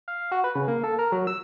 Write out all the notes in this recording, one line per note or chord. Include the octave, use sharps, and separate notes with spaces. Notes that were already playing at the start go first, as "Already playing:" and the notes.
F5
F#4
B4
C#3
A#3
A4
A#4
F#3
E6